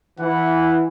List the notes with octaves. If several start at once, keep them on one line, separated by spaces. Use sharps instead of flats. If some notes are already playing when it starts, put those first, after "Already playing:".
E3 F#5